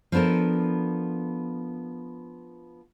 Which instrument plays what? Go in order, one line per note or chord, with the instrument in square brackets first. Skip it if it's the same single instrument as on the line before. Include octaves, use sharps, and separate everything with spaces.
[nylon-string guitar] F3 B3 D4 A4 A#4